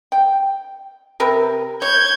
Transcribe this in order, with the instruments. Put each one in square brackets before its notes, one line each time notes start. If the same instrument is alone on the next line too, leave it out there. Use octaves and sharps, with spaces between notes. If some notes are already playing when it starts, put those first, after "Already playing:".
[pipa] G5
C3 A#4 B4
[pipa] C#5 [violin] G6 G#6